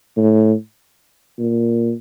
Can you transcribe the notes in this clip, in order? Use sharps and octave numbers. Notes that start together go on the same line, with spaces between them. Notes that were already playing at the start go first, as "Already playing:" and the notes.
A2
A#2